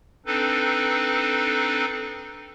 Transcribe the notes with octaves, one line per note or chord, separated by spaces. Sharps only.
C4 D4 D#4 A4 B4